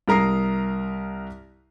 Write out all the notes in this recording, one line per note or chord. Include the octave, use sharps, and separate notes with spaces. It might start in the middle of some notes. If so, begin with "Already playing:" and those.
C2 A#4 A#5 D#6 C7